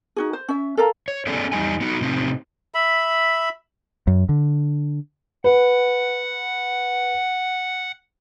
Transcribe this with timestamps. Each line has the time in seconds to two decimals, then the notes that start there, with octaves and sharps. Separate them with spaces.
0.16 D#4 F#4 G#4
0.33 C5
0.49 C#4 E5
0.77 A4 A#4 F5 A#5
1.08 C#5
1.27 A3 B3 C#4 G#4 A4 D5
1.52 E2 G2 G3 D#4 G#5
1.81 B3 D#4 F#4
2.01 A2 C3 C4 D#4
2.74 E5 B5
4.07 F#2
4.29 D3
5.44 B4 F#5